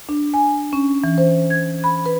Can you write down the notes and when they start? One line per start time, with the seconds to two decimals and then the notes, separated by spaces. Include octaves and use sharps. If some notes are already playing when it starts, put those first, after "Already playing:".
0.09 D4
0.34 G#5
0.73 C#4
1.04 E3
1.18 C5
1.50 G#6
1.84 B5
2.06 B4